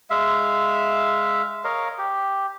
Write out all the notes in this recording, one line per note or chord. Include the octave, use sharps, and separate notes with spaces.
G#3 E5 F5
A#4 C#5 D#5 F5
G4